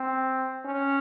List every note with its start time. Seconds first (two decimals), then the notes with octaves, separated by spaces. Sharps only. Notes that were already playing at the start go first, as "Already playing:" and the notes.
Already playing: C4
0.65 C#4